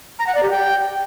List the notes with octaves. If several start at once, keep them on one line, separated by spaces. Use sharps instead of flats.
A#5
F#5
D5
G4
G5